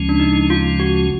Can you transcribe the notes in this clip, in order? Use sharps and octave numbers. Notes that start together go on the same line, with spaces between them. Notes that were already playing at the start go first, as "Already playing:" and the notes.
Already playing: D2 C#3 F3 G#3 C#4
D4
D#4
F4
F#4